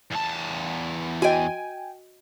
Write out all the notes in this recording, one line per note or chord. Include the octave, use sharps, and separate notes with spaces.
E2 A5
F#4 D#5 G5 G#5